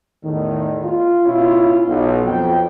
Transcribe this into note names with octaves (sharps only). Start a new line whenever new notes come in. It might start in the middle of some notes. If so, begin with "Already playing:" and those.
E2 A2 D#3
F4
B2 C#4 E4 F4
B1
F2 G5